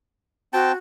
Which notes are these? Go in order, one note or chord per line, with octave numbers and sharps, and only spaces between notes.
C4 F#4 G5 A5